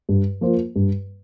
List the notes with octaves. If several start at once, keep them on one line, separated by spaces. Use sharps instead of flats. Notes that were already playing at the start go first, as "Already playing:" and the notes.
G2
F3 A#3 F4 C5
G2